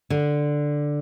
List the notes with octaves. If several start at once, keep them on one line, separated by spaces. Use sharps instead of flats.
D3